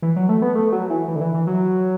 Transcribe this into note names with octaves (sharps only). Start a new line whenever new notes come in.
E3
F#3
A3
B3
A3
F#3
E3
E3
D3
E3
E3
F#3